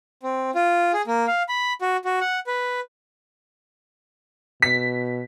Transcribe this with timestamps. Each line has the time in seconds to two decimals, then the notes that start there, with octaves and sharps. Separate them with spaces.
0.23 C4
0.55 F4
0.93 G#4
1.07 A#3
1.28 F5
1.49 B5
1.82 F#4
2.05 F#4
2.21 F#5
2.47 B4
4.62 B2 B6